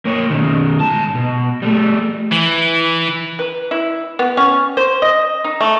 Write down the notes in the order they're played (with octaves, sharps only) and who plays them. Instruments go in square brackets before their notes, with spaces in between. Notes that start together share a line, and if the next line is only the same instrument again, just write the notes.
[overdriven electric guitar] A#3 C#5
B2 D#3
G#2 A5
B2
G3 A3
[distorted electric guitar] E3
[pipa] B4
E4
B3
C#4
C5
D#5
D#4
A3